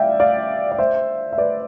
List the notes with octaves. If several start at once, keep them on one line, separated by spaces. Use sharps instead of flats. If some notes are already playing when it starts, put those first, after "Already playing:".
Already playing: D5 E5 F5 G5
D5 F5
D5
C5 E5
E5
B4 D5